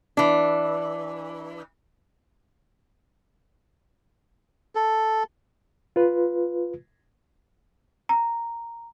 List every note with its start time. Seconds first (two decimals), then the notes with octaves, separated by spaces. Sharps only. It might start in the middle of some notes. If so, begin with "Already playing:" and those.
0.17 E3 D4
4.75 A4
5.96 F4 B4
8.09 A#5